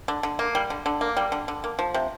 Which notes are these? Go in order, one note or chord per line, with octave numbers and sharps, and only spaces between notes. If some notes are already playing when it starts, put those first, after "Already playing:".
D3
D3
A#3
G3
D3
D3
A#3
G3
D3
D3
A#3
F3
C3